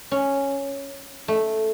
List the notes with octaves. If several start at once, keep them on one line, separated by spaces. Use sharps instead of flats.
C#4
A3